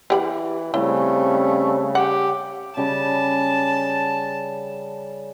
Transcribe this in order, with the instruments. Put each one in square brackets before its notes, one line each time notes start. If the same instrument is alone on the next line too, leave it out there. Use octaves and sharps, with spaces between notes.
[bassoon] E3 [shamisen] G4 G5 B5
[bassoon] C#3 [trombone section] G3 C4 C#4 [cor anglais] A3 [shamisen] E4
[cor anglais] G4 [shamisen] F#5
[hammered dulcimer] C#3 G3 [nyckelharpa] A5